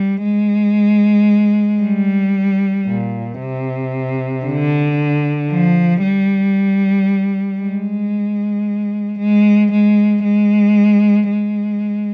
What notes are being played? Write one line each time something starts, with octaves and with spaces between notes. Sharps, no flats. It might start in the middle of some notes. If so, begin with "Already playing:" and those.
Already playing: G3
G#3
G3
A#2
C3
D3
F3
G3
G#3
G#3
G#3
G#3
G#3